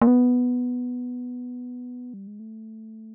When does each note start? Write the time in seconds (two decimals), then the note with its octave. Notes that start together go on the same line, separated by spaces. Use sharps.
0.02 A#3
0.07 B3
2.14 G3
2.27 G#3
2.40 A3